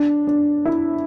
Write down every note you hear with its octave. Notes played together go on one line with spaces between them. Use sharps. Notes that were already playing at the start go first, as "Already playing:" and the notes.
Already playing: D4
D4
E4